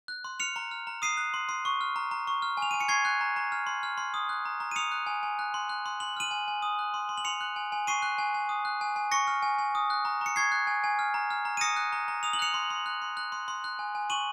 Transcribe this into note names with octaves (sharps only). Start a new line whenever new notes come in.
F#6
C6
F6 C#7 F7
A#5
F6
A#5
D#6 C7 D#7
F#6
C6
C6
C#6
F6
A#5
A#5
C#6
F6
G#5
F7
G#5 D#7
C#7
C#6 G#6 C7
F#6
A#5
A#5
F6
C6
F6
C6
D#6
F#6
A#5
A#5
D#7
D#6 C#7 F7
F#6
G#5
G#5
F#6
C6
F#6
C6
C6 F#7
F6 D#7 F#7
G#5
G#5
D#6
F#6
C6
C6
F#7
C6 C#7 F7
F#6
G#5
G#5
C#6 C7 D#7
F#6
G#5
G#5
D#6
F#6
G#5
G#5
C#6 A#6 C#7
F6
G#5
G#5
D#6
F#6
A#5
A#5 C#7
C#6 G#6 C7
F#6
G#5
G#5
F6
A#5
F6
A#5
D#7
D#6 A#6 C#7
F#6
A#5
A#5
D#6 F7
F#7
F#6 C#7 F7
C6
C6
F#6
C6
F#6
C6
C6
F#6
G#5
G#5
C#6 D#7 F#7